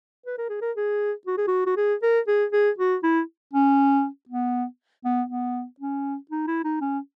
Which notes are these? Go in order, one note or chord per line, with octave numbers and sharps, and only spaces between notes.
B4
A#4
G#4
A#4
G#4
F#4
G#4
F#4
F#4
G#4
A#4
G#4
G#4
F#4
E4
C#4
B3
B3
B3
C#4
D#4
E4
D#4
C#4